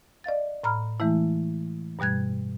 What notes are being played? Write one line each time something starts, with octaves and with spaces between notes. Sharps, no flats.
D5 D#5 F5 A6
A2 A#5 B5 F6
E3 G#3 A3 E4
G2 B2 G3 F#6 G#6